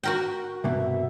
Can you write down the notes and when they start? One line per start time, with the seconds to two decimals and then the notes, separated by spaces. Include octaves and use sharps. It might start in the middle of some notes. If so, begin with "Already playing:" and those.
0.03 F#4 A#4 G5
0.64 C2 G2 B2 E5